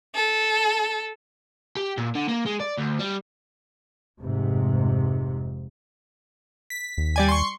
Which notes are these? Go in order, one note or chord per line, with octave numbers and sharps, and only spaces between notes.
A4
G4
A#2
D3
A#3
G#3
D5
D2
G3
F1 G#2 C3
B6
D#2
G3 D5 G#5
C6 C#6